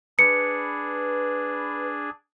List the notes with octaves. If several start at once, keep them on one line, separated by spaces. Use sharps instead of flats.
D4 G#4 B4 C#7